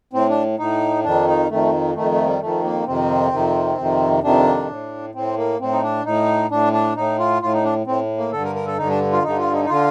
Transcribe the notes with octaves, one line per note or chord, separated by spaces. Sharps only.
A2 C4
D4
A2 D#4
F2 D#3 D4
D#4
F2 D#3 A3
F2 D#3 A3
A3
G3
F2 D#3 A3
A#3
F2 C3 D#3 C4
F2 C3 D#3
F2 C3 D#3
F2 C3 D#3 D4
A2
A2 C4
A#3
A2 C4
D#4
D4
A2 D#4
A2 D4
D4
A2 D#4
F4
A2 F4
D#4
D4
A2 C4
A#3
G2 D3 A4
A#4
A#4
A4
G2 D3 D#4
D4
F4
G2 D3 D#4
F4
D#4
D#4
D3 F4